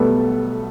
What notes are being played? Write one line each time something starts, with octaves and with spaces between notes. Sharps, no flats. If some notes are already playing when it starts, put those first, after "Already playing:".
Already playing: B1 B2 G3 A3 B3 A4